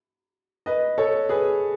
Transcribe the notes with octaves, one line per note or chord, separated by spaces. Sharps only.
B4 D#5
A4 C#5
G#4 B4